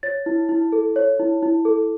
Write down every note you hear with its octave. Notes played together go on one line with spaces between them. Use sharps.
C#5 A6
E4
E4
A4
C#5
E4
E4
A4